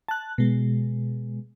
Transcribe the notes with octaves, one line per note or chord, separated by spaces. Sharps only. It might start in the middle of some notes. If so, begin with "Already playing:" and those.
A5 F#6
B2 G#3